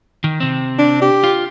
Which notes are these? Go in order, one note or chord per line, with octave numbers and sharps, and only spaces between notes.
D#3
C3 C4
D4
G4
F4